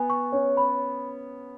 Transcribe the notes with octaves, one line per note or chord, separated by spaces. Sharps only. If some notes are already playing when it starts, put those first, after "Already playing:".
Already playing: B3 G#5
C#6
C#4 C#5
B5